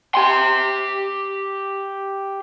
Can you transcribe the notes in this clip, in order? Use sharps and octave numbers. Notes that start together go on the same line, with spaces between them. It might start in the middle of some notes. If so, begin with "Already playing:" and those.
G4 C6